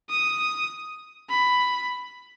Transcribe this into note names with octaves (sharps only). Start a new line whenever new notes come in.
D#6
B5